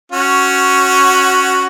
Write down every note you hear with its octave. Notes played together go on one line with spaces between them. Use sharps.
C#4 F#4